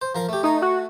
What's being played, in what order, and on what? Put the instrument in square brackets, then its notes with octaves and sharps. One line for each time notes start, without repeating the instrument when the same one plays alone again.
[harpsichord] C5
F3 A#4 F5
A3 G4
[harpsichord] A3 G#5 [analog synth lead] D#4
[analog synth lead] F#4